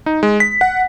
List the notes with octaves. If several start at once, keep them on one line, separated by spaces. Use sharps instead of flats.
D#4
G#3
B6
F#5